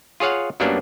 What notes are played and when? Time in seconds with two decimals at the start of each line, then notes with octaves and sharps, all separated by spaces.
0.20 F4 G#4 C#5 F5 F#5
0.60 F#2 F#3 G3 A#3 B3 D4